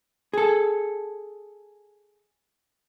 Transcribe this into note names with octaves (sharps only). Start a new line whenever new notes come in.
G#4 A4